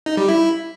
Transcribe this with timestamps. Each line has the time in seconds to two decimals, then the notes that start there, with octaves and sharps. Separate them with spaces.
0.06 D#4
0.17 G3
0.28 E4